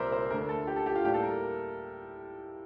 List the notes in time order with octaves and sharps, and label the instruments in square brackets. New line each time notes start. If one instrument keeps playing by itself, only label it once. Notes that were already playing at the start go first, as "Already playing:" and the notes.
Already playing: [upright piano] C2 A#2 G3 A#4 C5 D5 E5
C5
D2 D3 A3 A#4
A4
G4
A4
G4
F4
A2 G3 A#3 G4
A4
A#4